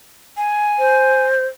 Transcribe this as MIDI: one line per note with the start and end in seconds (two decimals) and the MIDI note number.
0.37 1.25 80
0.79 1.46 72